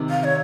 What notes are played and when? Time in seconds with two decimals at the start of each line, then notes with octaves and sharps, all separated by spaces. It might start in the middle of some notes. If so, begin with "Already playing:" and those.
Already playing: C3 D#3
0.10 F5
0.24 C#5